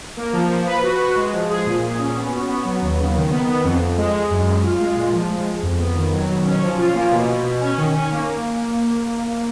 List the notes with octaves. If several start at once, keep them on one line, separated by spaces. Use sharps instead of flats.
A#3
F3
F3
B4
F#4
F#4
G#3
F3
G#4
A#2
A#2
C#4
B3
F#4
B3
F#3
D#2
C#3
D#3
B3
B3
F2
F2
G#3
G#3
F#2
F#2
F4
G#3
A#2
F3
G#3
F3
F2
B3
D#3
F#3
B2
C#4
F3
F4
A#3
B2
B2
B2
C#4
D#3
C#4
A#3